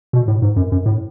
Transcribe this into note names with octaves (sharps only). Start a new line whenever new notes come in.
B2
A2
G#2
F#2
F#2
A2